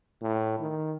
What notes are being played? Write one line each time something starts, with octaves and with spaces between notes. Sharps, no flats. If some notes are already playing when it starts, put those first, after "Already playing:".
A2
D#3